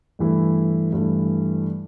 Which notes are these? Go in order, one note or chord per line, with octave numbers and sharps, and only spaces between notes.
G2 E3 A3 E4
G2 E3 A3 E4